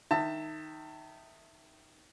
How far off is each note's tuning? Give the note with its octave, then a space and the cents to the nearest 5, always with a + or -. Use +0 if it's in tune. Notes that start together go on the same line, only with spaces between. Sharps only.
D#3 +0 E5 +0 A5 +30